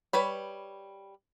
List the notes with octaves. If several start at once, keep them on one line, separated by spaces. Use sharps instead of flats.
G3 B4 C#5 B5